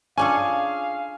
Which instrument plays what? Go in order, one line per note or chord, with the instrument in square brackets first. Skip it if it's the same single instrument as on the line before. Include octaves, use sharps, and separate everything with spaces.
[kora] C#4 D4 A4 [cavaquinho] F4 G#4 C#5 [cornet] F5 [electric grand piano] G#5